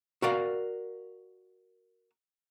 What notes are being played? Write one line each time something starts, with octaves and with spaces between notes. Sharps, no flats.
F#4 A#4 D5 F5